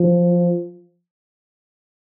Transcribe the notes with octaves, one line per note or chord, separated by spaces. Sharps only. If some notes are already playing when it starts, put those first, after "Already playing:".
Already playing: F3